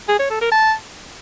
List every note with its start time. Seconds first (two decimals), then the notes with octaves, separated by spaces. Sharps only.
0.09 G#4
0.19 C#5
0.30 A4
0.41 A#4
0.52 A5